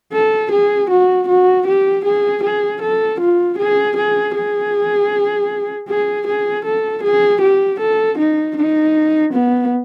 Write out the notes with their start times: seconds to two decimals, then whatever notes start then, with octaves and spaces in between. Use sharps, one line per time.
0.13 A4
0.51 G#4
0.90 F#4
1.28 F#4
1.67 G4
2.05 G#4
2.43 G#4
2.81 A4
3.20 F4
3.58 G#4
3.96 G#4
4.35 G#4
5.89 G#4
6.26 G#4
6.65 A4
7.03 G#4
7.41 G4
7.80 A4
8.18 D#4
8.56 D#4
9.33 B3